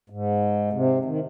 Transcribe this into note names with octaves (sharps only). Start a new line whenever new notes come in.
G#2
C3
D#3